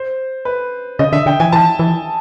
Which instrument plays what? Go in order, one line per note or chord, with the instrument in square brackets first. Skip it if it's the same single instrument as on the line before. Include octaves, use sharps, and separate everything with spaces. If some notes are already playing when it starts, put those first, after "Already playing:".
Already playing: [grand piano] C5
B4
[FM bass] C#3 [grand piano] D#5
[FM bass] D3 [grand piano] E5
[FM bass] D3 [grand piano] G5
[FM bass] E3 [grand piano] G#5
[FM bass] E3 [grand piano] A5
[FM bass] E3